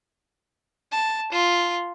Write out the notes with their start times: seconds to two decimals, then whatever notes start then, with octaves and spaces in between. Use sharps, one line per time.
0.92 A5
1.32 F4